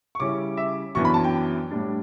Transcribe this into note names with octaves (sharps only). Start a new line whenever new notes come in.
C#6
C#3 G3 C#4 E4 D6
E5
F#2 E3 B3 D4 C#6
B5
A5
G5
A2 G3 D4